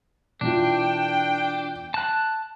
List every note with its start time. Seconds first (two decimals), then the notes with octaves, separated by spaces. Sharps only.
0.41 B2 E3 D4 F4 G5
1.94 A5 F#6